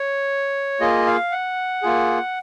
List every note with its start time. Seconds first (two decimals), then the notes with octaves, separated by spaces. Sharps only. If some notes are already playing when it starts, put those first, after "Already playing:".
Already playing: C#5
0.80 A#3 F4 G#4 D#5
1.07 F5
1.31 F#5
1.83 A#3 F4 G#4